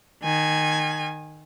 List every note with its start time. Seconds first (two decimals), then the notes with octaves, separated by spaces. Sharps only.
0.23 D#3 G#5